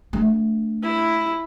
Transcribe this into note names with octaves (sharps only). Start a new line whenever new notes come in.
A3 D4
E4